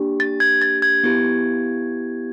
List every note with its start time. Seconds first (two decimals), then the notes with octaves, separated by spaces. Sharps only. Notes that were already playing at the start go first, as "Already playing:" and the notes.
Already playing: A#3 D4 G4
0.20 A6
0.40 G#6
0.62 A6
0.82 G#6
1.04 B3 E4 G4